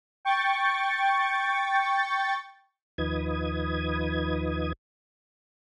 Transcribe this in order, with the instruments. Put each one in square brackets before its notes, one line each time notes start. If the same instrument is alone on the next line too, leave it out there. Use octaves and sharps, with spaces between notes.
[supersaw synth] G5 C#6 A6
[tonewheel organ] D#2 F3 D#4 B4 D#6 G#6